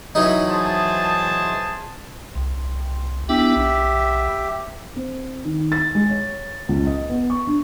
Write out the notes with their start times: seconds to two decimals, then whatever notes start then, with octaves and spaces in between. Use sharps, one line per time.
0.15 E3 F#3 D#4
0.49 G#4 C5 A5
2.35 C2
3.29 B3 D4 E4 G4 E5
3.56 B1
4.96 C4
5.45 D#3
5.72 A6
5.95 G#3
6.09 C#5
6.69 C#2
6.86 D#5
7.09 B3
7.30 C#6
7.47 D4